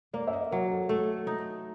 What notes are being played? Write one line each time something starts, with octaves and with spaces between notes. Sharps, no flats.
A#3 D5
E5
D#5
F#3 A#4
A4
A3 A4
D#4